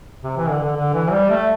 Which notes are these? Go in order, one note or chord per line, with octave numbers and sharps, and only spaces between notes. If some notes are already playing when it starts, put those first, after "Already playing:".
C3
E3
D3
D3
D3
E3
G3
A3